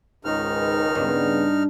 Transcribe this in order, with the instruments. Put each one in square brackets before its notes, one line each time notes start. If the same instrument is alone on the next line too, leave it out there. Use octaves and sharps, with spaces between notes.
[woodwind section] C#2 D#3 [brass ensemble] G#2 [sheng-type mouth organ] D#4 F6
[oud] G2 [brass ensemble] C#3 B3